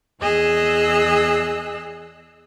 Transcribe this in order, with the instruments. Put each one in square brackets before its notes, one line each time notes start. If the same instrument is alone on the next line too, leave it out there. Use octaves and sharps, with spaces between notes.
[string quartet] E2 G#4 D#5 E6 F#6